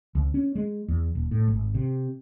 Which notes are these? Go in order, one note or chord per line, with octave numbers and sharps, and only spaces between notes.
C#2
C#4
G#3
E2
D#1
A2
G#1
C3